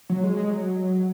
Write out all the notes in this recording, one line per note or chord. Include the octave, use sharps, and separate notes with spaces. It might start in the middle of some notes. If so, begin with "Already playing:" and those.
F#3
G#3
G#3
F#3